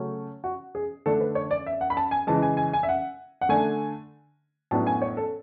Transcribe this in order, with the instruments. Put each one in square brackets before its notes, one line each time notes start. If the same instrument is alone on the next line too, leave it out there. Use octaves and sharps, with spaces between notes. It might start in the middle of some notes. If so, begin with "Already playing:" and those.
Already playing: [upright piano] C#3 F#3 A3 C#4
F#4
G#4
D3 A3 D4 A4
B4
C#5
D5
E5
F#5
B5
A5
G#5
C#3 E3 G#3 A5
G#5
G#5
G#5
E5
F#5
F#5
D3 A3 D4 G#5
A2 F#3 B3 D4 A5
G#5
C#5
A4